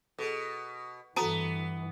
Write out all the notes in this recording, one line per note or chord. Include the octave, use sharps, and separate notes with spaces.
B2 G#4 A4
G2 E3 B3 F#4 A4 A5 A#5 D#6